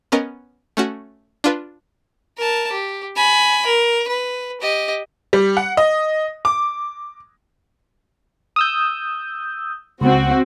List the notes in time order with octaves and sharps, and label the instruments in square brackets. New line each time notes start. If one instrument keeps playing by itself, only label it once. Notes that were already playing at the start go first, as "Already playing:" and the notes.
[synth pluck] B3 C#4 A#4 D#5
A3 C#4 F#4
D4 F4 B4
[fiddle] A#4 A5
G4
G#5 B5
A#4
B4
G4 D#5
[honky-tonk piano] G3
F#5
D#5
D6
[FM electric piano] D#6 E6 G6
[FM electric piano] C#2 [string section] C4 F#4